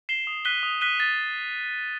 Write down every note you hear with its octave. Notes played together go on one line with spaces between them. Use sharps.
C7 E7 G7
D#6
F#6 B6 D#7 G7
D#6
F#6 B6 D#7 G7
A6